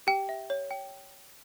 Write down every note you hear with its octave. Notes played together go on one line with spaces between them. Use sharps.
G4 G5
E5
C#5
G5